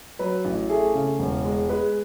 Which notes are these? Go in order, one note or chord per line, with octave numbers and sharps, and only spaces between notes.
F#3 B4
A1
A3 G#4
C#3
E1
G#3
G#3 B4